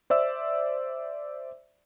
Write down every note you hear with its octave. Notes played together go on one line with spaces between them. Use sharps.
C5 D5 E5 E6